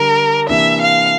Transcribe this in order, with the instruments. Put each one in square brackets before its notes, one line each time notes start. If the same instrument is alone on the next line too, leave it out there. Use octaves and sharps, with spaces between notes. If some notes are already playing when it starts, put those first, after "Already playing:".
Already playing: [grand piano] D3 G3 D4 [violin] A#4
[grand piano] C3 E3 A#3 D4 [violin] E5
[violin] F5